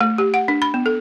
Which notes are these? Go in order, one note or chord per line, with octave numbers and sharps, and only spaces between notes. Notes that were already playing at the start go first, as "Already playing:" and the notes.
A3
G4
F#5
D4
B5
B3
A4